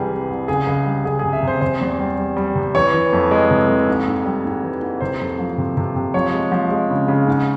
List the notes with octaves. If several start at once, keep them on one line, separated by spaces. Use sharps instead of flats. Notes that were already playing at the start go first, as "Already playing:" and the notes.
Already playing: C2 C3 E3 G3 G#4
E3
C2
C#2 G#4
C#2
G3
C#2 G#4
C3 G#4
E5
C3 C5
C3 C5
E2
G3
G3
G3
C3
E3 C#5
E3
F2
G#3
C3
F2
G#2
G#2
G3
G#2
E3
G#2
C3 C5
F2
F3
C3
C3
C3
F3 C#5
G#3
F3
G#3
C#3
C#3
G#2